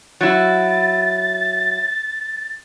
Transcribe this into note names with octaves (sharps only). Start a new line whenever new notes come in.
F#3 E4 A6